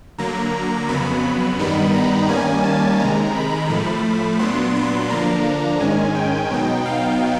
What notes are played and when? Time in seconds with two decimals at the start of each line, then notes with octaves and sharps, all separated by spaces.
0.18 D3 F#3 A#3 A#5
0.88 F2 C#3 F#3 B3 B5
1.59 G2 D#3 G3 B3 D#4
1.94 A#5
2.29 D#3 G3 A#3 C#4 G#5
2.64 A5
3.00 C3 D#3 G#3 A#5
3.35 B5
3.70 A2 F3 A3
4.39 A#2 F#3 B3 D4 C6
4.75 B5
5.10 D3 F3 A#3 D4 A#5
5.80 G#2 D#3 G#3 C#4 G#5
6.15 G5
6.50 B2 F#3 B3 D#4
6.86 F5